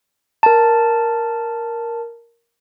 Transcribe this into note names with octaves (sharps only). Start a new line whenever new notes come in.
A#4 A5